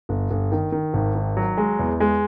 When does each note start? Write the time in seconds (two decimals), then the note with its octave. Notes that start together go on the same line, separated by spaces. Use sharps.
0.09 G1
0.31 G1
0.52 D#3
0.72 D#3
0.94 G#1
1.15 D#3
1.37 F#3
1.57 G#3
1.79 E2
2.00 G#3